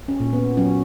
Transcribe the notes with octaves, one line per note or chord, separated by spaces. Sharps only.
C#4
A#2
B3
F#3 C#4